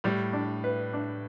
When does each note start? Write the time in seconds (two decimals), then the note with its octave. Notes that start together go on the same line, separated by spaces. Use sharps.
0.04 A2 G3
0.33 D4
0.64 B4
0.93 D4